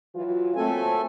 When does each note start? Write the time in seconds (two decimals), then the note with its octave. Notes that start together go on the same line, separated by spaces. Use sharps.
0.15 E3 F#3 F4
0.56 F#3 A3 A#3 C4 A4 G#5